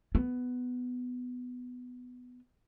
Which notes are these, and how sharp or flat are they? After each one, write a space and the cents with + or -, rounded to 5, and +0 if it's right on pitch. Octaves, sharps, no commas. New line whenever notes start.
B3 +10